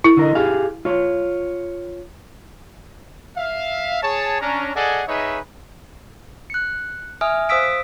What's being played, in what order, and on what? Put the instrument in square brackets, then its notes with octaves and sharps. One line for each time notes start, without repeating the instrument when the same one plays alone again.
[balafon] E4
[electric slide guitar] D3 A#4 D#5
G4 G#4 F5
F4 C#5
[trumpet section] E5 F5
G#4 C#5 A5
C#4 D4 A#5
G#4 A4 D5 D#5 F#5 G#5
D#4 G#4 B4 C#5 D#5 E5
[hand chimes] F#6 C#7
E5 G#5 D#6 F6
C5 F5 D#6 E6 B6 D7